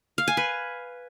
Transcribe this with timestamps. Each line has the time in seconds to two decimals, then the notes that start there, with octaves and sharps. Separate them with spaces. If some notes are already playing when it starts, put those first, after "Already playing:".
0.18 F5
0.28 G#5
0.37 B4